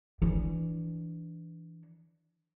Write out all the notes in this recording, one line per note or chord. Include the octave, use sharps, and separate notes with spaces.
E3 D4